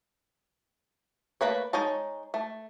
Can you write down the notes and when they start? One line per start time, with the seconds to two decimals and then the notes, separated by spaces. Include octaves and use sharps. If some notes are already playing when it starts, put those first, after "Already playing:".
1.41 A3 A#3 B4 C#5
1.73 G#3 D#4 C#5 A5
2.34 A3